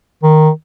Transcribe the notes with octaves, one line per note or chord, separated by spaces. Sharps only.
D#3